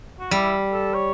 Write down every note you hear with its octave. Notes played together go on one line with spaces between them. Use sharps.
F#4
G3 E4
A4
C#5